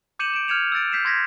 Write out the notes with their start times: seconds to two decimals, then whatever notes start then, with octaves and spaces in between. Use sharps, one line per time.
0.19 D6 G6 C#7 D#7 E7 F#7
0.34 D7 E7
0.48 F6 G6 G#6 C#7 E7 F7
0.72 E6 F#6 A6 D7
0.92 G6 B6 C7 D7 E7
1.05 C6 G#6 A#6 B6